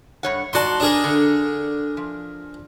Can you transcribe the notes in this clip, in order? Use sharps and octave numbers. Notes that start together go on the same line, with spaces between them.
G2 C#5 F#5
G#2 F#4 D5 A5 C6
D4 G#4 A#4
D3
F3